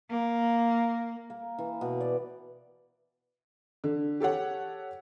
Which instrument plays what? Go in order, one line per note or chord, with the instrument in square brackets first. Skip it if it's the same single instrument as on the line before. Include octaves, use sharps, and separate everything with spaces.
[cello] A#3
[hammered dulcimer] A#3
E3
B2
D5
[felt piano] D3
G4 A4 C#5 F#5